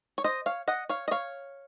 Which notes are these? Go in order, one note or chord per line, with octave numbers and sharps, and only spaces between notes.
C#5
C5 D#5
C#5 F5
D#5 F#5
C#5 F5
D#5
C#5 F5